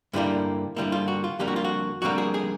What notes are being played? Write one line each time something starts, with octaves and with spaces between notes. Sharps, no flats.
G2 D3 G3 A#3 E4
G2 D3 G3 A#3 E4
F4
F#4
F4
F2 D3 G3 A#3 G4
F#4
F4
F#4
F2 D3 G3 A#3 F#4
G#4
G#4